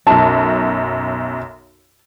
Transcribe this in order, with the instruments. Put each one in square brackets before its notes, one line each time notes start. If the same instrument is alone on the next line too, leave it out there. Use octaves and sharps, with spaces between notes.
[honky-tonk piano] B1 F#2 [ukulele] A5